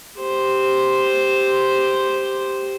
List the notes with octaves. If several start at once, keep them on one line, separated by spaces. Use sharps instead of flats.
G4 C5